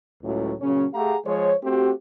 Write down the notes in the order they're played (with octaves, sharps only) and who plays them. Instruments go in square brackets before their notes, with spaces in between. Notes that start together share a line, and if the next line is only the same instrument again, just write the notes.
[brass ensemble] C#2 A2 F#3
A#2 C#3 F#3 C#4
A3 G4 G#4 F5 F#5 A#5
F3 G#3 C5 C#5
A3 C4 F#4 G4